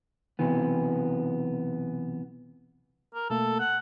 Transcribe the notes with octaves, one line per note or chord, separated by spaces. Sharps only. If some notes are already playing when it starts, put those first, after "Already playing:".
B1 C3 E3 B3
A#4
B2 A3 A#3 A4
F#5